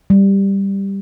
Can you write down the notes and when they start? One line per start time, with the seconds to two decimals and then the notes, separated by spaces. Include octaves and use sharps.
0.10 G3